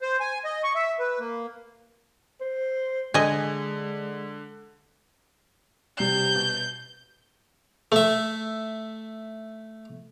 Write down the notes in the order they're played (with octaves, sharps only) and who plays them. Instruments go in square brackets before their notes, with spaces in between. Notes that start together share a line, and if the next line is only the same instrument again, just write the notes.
[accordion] C5
G#5
D#5
C#6
E5
B4
A#3
[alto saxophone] C5
[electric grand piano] D3 [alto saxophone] G#3 [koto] D#5 G#5
[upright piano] C3 G3 C7 [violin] G6
[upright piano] B2
[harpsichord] A3 E5